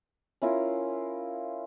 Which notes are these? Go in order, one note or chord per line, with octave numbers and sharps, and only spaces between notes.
C#4 E4 F4 A#4